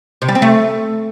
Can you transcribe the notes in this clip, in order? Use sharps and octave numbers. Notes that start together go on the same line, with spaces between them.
C3
G3
C4
A3